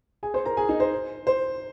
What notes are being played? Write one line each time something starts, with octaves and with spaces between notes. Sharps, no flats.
G#4 G#5
C5 C6
A#4 A#5
G#4 G#5
D#4 D#5
C5
C5